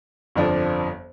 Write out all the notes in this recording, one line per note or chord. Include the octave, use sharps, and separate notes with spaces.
G1 F2 F3 D4